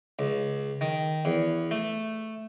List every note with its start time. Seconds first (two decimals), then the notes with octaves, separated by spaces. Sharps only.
0.19 C#2
0.81 D#3
1.25 E2
1.71 A3